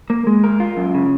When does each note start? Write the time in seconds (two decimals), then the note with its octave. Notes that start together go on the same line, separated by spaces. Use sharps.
0.10 A#3
0.27 G#3
0.44 A#4
0.60 F4
0.77 F#2
0.94 C#3